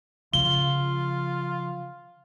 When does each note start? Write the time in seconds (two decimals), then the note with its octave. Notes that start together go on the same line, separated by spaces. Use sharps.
0.33 C#3 F3 F4 G7